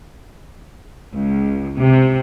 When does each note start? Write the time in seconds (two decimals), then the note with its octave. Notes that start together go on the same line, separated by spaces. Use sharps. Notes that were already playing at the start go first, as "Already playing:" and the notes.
1.13 C#2
1.77 C3